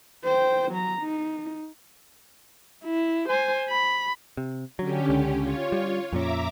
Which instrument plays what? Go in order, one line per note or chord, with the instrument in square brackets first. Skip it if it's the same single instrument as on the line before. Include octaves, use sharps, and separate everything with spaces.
[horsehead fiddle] C5 G5
F#3 A#5
D#4
[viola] E4
C5 G#5
B5
[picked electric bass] C3
[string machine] D3 C#4 G4 [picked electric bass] F#3
[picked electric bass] C#2
[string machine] F4 C#5
[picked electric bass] G3
[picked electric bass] F2 A#2 C#4 [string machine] E5 A#5 D6